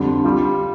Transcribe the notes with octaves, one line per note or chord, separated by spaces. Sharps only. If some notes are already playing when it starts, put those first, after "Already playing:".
Already playing: F2 D3 G3
G3 F4